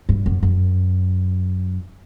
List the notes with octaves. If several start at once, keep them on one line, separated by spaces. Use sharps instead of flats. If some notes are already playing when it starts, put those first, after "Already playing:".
G2
F#2
F#2